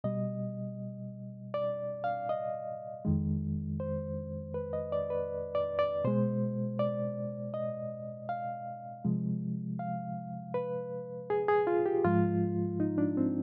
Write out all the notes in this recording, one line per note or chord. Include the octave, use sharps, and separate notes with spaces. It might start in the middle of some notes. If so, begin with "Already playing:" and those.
B2 G3 D#5
D5
F5
D#5
F2 D#3 G#3
C5
B4
D#5
D5
B4
D5
D5
B2 G#3 C5
D5
D#5
F5
C3 F3 G#3
F5
B4
G#4
G#4
F4
G4
G#2 F3 G#3 F4
D#4
D4
C4